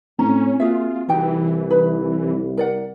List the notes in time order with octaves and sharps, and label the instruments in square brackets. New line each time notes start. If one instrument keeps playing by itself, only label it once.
[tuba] A2 [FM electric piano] C4 [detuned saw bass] C#4 [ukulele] A#5
[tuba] A#3 [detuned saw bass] F4 [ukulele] F#4 G#4 E5
[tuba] C2 [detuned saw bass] E3 [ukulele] D#4 F#4 G5
[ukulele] D#4 B4 B5
A#4 D5 F#5